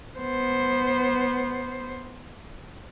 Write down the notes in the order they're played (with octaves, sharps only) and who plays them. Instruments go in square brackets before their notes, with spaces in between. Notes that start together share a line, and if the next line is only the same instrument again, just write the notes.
[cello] B3 C5